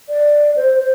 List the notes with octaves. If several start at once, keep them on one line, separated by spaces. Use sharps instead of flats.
D5
C5
C5